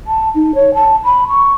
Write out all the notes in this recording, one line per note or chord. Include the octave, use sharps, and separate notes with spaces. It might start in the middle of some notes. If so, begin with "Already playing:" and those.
A5
D#4
C#5
A5
B5
C#6